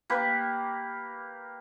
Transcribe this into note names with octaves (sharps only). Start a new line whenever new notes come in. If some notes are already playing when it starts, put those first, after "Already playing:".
A#3 G4 B4